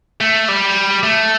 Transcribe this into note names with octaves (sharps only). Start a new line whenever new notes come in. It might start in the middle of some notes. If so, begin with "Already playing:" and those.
A3
G3
A3